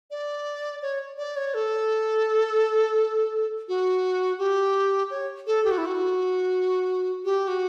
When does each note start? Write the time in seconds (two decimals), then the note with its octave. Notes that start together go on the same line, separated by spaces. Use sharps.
0.11 D5
0.82 C#5
1.18 D5
1.36 C#5
1.54 A4
3.68 F#4
4.39 G4
5.10 C#5
5.47 A4
5.64 G4
5.71 F#4
5.78 E4
5.86 F#4
7.25 G4
7.48 F#4